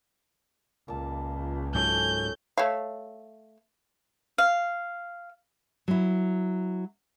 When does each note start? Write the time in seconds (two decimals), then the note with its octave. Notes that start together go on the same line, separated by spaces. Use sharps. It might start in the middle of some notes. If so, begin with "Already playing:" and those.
0.88 C#2 A#2 A5
1.75 G#2 F#3 C#4 G#4 A4 G6
2.58 A3 C#5 F5
4.38 F5
5.88 F#3 E4